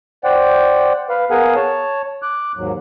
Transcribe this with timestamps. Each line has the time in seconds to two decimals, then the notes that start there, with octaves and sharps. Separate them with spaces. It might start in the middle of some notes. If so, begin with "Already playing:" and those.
0.24 C5 D5 F#5 G5
1.09 B4 F5
1.31 B3 G#4 A#4 F5 F#5 G#5
1.55 C#5 A5
2.22 D6 F#6
2.57 D#2 G#2 F#3